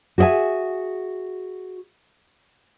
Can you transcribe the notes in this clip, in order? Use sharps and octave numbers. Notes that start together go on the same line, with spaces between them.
F#4 G#4 D5 E5 G#5